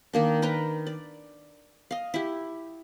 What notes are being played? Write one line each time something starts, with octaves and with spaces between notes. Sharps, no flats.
D#3 A#3 D4
A#4 B4 G5 A#5
D5
D#5 F5
E4 G4